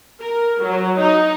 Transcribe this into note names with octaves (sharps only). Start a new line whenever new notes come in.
A#4
F#3
D#4